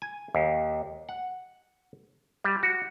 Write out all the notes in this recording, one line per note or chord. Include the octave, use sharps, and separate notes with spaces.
G#5
D#2
F#5
G3
F#4